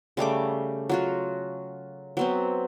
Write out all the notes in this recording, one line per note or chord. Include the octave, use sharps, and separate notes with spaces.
C#3 G3 A3 D6
F#3 F4 F#4
F#3 B3 C4